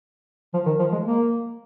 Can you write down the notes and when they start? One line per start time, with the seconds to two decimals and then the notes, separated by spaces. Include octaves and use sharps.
0.54 F3
0.66 D#3
0.79 F3
0.92 G#3
1.06 A#3